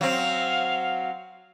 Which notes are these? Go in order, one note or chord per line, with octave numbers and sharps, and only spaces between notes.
F#3 C4 F5